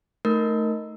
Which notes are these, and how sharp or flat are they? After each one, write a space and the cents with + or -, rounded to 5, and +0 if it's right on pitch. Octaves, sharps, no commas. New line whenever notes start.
A3 +0 D#4 +0 A#4 +0